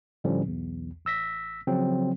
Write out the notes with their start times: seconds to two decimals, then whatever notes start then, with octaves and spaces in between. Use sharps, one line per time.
0.24 A2 D3 F3 G3 C#4
0.46 B1 E2
1.05 A1 E6 A#6 B6
1.67 C#3 F3 F#3 C4